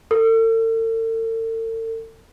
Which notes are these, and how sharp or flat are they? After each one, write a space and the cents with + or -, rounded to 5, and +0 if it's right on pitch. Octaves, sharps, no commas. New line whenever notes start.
A4 +45